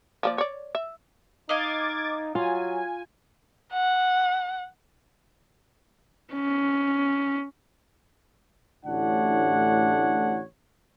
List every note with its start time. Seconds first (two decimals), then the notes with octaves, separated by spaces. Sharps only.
0.23 F3 A#3 D5
0.38 C#5 D5
0.75 E5
1.49 D#4 D#5 F5 D6 G#6 A6
2.35 F#3 F4 G#5
3.73 F#5
6.33 C#4
8.86 A1 D2 A2 D4 C#5 F#5